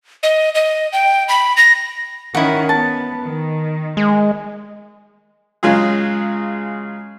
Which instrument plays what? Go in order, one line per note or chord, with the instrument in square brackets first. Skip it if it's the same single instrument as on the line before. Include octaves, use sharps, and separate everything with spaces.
[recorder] D#5
D#5
G5
B5
A#6
[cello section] D#3 C#4 [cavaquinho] E4 F#5
[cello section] B3 [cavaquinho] A5
[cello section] D#3
[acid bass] G#3
[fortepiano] C#3 F#3 G#3 F4 G#4